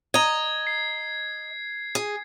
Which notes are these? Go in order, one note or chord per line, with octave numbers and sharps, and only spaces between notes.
D#5 A#5 G#6
C7
G#4